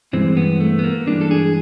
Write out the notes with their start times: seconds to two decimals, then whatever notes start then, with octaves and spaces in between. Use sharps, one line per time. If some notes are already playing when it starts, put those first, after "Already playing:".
0.13 G2 E3 G#3 C4
0.37 B3
0.60 A3
0.79 B3
0.84 A#3
1.07 G2 E3 G#3 D4
1.21 A4
1.31 G#4